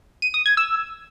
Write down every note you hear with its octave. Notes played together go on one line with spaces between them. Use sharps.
D#7
D#6
G#6
E6